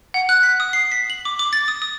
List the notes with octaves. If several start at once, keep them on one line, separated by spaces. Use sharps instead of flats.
F#5
F#6
B6
D#6
C7
B6
F#7
D6
D6
A6
D#6
D#6